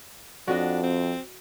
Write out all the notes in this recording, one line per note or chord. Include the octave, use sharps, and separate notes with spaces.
F2 D4 F#4 D#5
C4